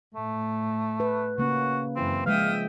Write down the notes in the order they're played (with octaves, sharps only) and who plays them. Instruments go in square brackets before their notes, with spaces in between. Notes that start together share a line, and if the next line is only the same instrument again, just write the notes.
[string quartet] A2 [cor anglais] A3
[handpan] B4
[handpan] C#3 A#3 C#4 [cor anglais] F#4
[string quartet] F#2 E3 [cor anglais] C4
[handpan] F3 G#3 [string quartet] E5 G5 D#6 [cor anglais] F5